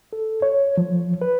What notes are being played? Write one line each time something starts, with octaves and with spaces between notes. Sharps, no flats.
A4
C#5
F3
B4